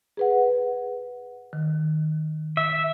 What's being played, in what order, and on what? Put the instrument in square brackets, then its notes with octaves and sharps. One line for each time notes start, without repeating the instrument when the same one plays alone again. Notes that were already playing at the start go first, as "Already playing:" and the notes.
[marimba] G#4 B4 F#5
D#3
[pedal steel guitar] E5